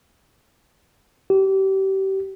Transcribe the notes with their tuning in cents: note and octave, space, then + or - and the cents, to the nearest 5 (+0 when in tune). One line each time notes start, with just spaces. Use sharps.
G4 -30